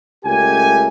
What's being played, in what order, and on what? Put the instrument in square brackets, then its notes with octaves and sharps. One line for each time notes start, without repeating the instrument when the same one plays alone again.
[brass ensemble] C#2 A3 G4 A#4 G#5